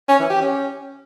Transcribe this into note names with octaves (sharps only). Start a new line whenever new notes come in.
C#4
E3
G4
C#4